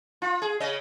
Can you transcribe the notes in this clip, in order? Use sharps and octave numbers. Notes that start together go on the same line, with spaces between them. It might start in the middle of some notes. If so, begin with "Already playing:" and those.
F4
G#4
C#3 D#5